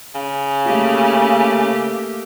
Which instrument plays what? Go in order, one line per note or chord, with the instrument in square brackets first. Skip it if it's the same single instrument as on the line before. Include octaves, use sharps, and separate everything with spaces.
[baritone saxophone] C#3
[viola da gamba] A3 A#3 G4